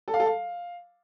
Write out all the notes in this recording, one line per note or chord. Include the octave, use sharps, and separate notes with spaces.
A4
F5
A4
F5